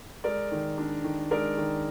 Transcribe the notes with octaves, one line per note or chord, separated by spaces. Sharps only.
G#3 A#4 D5
D#3
D4
D#3
G#3 A#4 D5
D#3